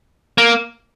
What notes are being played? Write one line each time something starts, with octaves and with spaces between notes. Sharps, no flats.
A#3